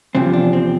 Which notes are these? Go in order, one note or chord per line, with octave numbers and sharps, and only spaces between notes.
E2 C3 F3 C4
D4
C4